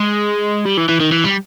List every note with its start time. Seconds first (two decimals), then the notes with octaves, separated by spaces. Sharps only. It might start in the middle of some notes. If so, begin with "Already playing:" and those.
Already playing: G#3
0.66 G3
0.77 E3
0.89 E3
1.00 D#3
1.12 E3
1.24 G3